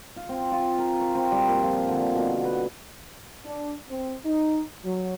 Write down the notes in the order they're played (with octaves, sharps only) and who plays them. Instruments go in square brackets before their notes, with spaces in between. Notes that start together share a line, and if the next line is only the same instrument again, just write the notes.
[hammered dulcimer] F4
C4
F4
A#4
C#6
C4
G3
A#2
F3
D3
B2
B4
[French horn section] D4
C4
D#4
F#3